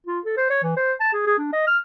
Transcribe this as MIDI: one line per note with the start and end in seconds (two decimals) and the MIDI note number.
0.07 0.20 65
0.25 0.37 69
0.37 0.46 72
0.50 0.59 73
0.63 0.73 52
0.77 0.93 72
1.00 1.13 81
1.13 1.24 68
1.26 1.34 68
1.38 1.48 62
1.53 1.64 75
1.67 1.78 89